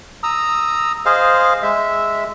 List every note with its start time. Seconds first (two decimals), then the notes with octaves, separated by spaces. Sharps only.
0.23 A#5 D#6 E6
1.06 G#4 C5 D#5 F5
1.63 G#3 E5